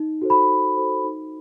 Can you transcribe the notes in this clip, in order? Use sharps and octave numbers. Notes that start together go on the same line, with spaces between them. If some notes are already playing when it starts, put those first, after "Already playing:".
Already playing: D#4
F#4 A4 C5
B5
D#4
F#4 A4 C5
D#4